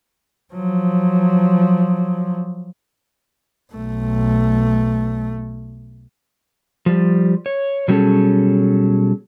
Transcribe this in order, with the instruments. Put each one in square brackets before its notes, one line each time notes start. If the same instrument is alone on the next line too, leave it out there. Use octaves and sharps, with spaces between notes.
[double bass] F3 F#3
B1 A3
[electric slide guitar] F3 G3
C#5
B2 F#3 G3 C#4 G#4 A4